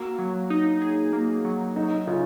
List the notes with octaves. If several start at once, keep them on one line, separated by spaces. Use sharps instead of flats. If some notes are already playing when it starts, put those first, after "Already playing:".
Already playing: A#3 F#4
F#3
D#4
G#4
A#3
F#3
F#3 D#4
C#3 F4